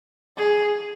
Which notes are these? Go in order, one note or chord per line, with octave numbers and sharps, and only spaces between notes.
G#4